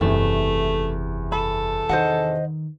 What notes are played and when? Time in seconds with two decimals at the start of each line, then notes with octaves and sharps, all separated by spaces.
0.01 F#1 E2 C3 A3
1.32 A4 B5
1.89 D#3 C5 D#5 F#5